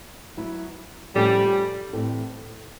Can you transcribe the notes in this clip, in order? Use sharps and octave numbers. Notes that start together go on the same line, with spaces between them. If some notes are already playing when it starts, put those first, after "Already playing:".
F#3 B3 E4
A2 F3 G3 A3 C#4
A2 E3 A3 C4